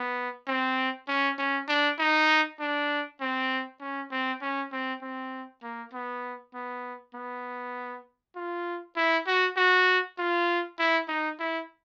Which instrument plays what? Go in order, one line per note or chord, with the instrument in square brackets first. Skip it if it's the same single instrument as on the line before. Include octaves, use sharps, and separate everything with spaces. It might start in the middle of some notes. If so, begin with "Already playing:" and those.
Already playing: [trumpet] B3
C4
C#4
C#4
D4
D#4
D4
C4
C#4
C4
C#4
C4
C4
A#3
B3
B3
B3
F4
E4
F#4
F#4
F4
E4
D#4
E4